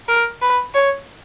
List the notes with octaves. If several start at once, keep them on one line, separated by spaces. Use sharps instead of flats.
A#4
B4
C#5